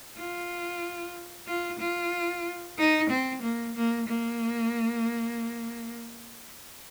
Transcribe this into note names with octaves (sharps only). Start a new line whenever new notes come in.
F4
F4
F4
D#4
C4
A#3
A#3
A#3